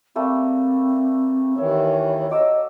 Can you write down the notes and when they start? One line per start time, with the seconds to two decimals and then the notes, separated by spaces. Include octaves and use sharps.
0.16 G3 A3 A#3 C4
1.58 D#2 D#3 E3 C#5 E5
2.30 F#3 D#5 D6 E6